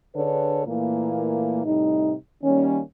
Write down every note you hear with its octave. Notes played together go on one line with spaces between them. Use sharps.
D3 D4 G#4 A4 B4 C#5
A#2 E3 A3 A#3
A2 C3 G3 D#4
D#3 G3 A#3 C#4